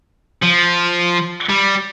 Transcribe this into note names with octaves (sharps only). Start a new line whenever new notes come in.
F3
G3